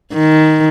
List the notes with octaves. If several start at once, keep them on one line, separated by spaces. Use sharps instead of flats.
D#3